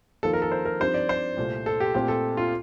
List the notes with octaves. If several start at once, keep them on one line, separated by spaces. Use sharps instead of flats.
F2 D#3 A#3 F4 A4
A#4
A4
C5
A#4
G2 F3 C4 D#4 G4 C5
D5
C5
C2 A#2 A3
A4
G4
A#2 A3 C4 G4
A4
F4